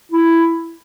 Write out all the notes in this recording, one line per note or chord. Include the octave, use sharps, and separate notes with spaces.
E4